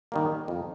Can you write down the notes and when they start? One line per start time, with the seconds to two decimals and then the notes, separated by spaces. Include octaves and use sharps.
0.12 D#3 G3 A#3
0.48 F2